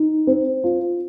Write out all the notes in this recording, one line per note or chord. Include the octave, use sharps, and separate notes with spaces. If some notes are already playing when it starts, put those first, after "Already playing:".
Already playing: D#4
C4
F4